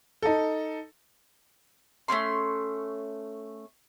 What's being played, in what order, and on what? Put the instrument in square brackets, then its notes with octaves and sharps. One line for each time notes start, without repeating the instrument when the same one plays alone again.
[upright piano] D#4 A4
[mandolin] A3 A#3 C#4 C6